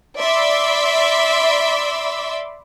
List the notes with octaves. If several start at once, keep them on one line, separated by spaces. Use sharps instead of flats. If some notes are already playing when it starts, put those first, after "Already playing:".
D5 E5 B5 C6 D6 E6